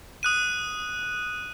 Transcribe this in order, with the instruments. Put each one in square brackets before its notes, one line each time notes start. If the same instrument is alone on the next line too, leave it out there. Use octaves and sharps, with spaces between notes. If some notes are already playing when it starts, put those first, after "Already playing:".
[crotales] D#6 F#6 D#7